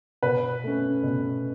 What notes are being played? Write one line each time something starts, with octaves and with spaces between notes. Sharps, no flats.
B2 B4
A3 C#4
B2